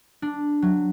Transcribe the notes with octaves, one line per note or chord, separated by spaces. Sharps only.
D4
F#3